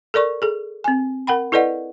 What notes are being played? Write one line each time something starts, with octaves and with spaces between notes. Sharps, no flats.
A4 A#4 D5 C#6
G#4 A4
C4 G#5
A#4 F#5 G5 B5
E4 A4 B4 D5 D#5 F#5